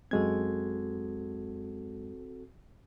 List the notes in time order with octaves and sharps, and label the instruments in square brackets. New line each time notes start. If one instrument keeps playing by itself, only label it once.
[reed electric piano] F#2 G#3 G#6 [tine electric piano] C4 F#4 A4